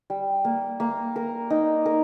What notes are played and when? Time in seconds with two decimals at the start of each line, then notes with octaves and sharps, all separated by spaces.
0.10 G3
0.45 A#3
0.80 A#3
1.16 A#4
1.50 D#4
1.85 A#4